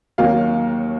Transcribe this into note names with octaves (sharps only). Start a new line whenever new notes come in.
D#2 D#3 F#3 A#3 F5